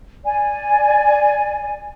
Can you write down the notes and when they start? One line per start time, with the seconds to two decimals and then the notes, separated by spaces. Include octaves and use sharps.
0.24 D5 G#5